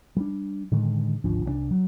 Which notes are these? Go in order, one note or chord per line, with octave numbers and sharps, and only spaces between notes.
G3 D4
A2 D3 D#3 G#3
G#1 D2 F3 D4
C2 E3 D4
F#3